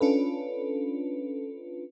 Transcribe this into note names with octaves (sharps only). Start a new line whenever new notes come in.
C#4 D4 F4 A4 B4